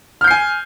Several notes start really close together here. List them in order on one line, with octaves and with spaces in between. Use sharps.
F6 G6 C7 G#5